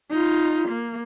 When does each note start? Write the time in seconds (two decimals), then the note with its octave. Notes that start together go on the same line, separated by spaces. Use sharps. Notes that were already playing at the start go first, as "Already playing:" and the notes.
0.10 D#4 F4
0.68 A#3